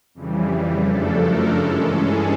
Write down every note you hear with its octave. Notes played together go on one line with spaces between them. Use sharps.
F2 C#3 E3 G3
F#2 C#3 F3 A3 D4 A4
A#4
G2 E3 G#3 C#4 A4
G#4